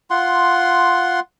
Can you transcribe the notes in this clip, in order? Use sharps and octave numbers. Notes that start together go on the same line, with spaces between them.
F4 F#5 C6